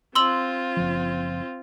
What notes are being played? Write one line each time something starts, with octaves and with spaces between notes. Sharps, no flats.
C4 F4 C6 E6 F#7
F#1 F3